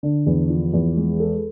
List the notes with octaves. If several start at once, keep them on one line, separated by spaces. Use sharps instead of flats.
D3
E2
F3
E2
G#3
A4